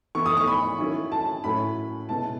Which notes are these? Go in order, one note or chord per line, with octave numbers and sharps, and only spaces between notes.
E3 B3 E4 C#6
D#6
C#6
B5
D#3 F#3 C#4 E4
A5
A2 F#3 C#4 E4 B5
B2 G#3 B3 E4 A5